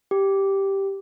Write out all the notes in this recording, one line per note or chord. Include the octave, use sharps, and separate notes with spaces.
G4